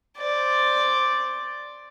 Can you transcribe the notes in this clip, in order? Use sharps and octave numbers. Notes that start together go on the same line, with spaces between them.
C5 D5